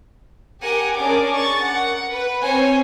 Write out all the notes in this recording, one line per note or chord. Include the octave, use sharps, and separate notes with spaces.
G4 A#4 F#5 G#5
C#4 D4 G#4 A#4 D6
C#6 A6
A#4 F#5
B4
C4 C5 C#5 G#5